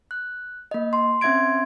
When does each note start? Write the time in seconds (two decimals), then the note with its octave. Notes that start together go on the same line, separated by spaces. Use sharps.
0.11 F#6
0.71 A#3 D#5
0.93 C6
1.21 C4 C#4 E5 C6 G#6 D7